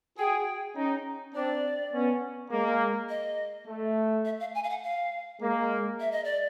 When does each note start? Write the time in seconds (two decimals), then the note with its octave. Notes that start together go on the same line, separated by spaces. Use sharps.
0.18 F#4 G#4 G5
0.76 C#4 D#4
1.34 C4 D4 D5
1.93 B3 C#4
2.51 G#3 A#3
3.09 D#5
3.67 A3
4.25 E5
4.40 F5
4.55 G#5
4.64 F5
4.70 F#5
4.83 F5
5.42 G#3 A#3
6.00 E5
6.12 D#5
6.24 D5